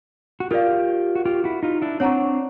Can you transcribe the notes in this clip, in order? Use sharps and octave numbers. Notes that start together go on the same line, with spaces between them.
F#4
F4 G4 A#4 D5 F5
F#4
F4 G4
E4 F#4
D#4 F4
D4 E4
C4 D4 C#5 F#5 A#5 C#6